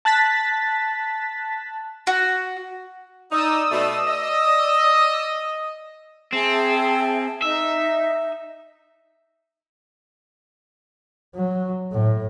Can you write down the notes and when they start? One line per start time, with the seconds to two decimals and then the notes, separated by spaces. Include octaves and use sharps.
0.05 A5 F#6 A6 B6
2.07 F#4
3.32 D#4 D5 D#6 E6
3.71 B2 A3
4.08 D#5
6.33 C4 G#4 E5 A5
7.42 D#4 E5
11.35 F#3
11.92 A2